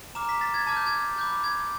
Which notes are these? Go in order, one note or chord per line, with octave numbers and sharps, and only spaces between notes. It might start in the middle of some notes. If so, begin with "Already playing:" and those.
A#5 D6 F6 E7
B6
A6
G#6
A5 D6 F6 G#6
G6
G#6
B5 D6 F#6 G6
G#6